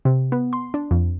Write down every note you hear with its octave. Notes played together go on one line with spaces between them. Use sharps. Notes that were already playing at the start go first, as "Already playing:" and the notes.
C3
B3
C6
D4
F2